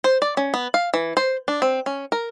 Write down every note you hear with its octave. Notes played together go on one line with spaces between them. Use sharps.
C5
D5
C#4
B3
F5
E3
C5
D4
C4
C#4
A#4